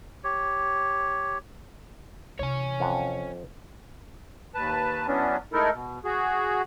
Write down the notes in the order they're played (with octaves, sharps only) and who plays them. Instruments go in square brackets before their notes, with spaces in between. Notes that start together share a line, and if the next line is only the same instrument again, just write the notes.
[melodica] G4 C#5
[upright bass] C3 E3 [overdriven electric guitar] C#5 G#5
[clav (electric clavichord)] F2 F#5 A5
[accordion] D#2 B4 A5
E3 F#3 B3 C#4 D4
G#3 A3 D#4 E4 A4 A#4
B2
F#4 G#4